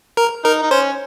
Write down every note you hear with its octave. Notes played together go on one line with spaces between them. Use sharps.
A#4
D#4 A#4
D#4
C#4 C5